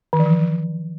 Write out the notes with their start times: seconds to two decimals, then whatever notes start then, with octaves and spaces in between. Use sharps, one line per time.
0.13 D#3
0.19 E3
0.26 F3